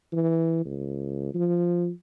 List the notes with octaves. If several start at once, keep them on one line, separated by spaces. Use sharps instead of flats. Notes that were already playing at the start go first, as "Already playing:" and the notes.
E3
C#2
F3